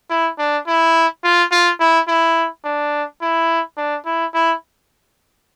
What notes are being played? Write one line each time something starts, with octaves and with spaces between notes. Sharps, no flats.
E4
D4
E4
F4
F4
E4
E4
D4
E4
D4
E4
E4